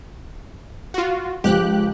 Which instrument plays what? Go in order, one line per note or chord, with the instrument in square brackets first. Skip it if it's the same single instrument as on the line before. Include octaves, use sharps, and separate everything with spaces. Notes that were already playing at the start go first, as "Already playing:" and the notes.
[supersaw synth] F4 F#4
[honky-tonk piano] C#2 F3 [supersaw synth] G4 F#6